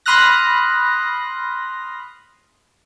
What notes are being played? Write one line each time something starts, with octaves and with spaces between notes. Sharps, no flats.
B5 C6 D#6 F6 F#6 A#6